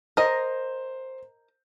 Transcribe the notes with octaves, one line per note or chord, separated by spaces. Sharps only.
A#4 C5 D#5